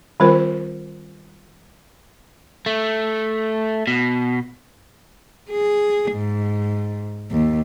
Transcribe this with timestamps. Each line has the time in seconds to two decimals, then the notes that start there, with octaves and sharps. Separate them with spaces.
0.20 D#3 G3 C4 F4 A#4 C5
2.66 A3
3.87 B2
5.50 G#4
6.13 G#2
7.31 D#2